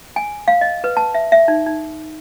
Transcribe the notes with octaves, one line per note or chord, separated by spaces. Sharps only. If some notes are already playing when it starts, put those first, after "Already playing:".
G#5
F5
D#5
B4
A5
E5
E5
D#4
D#4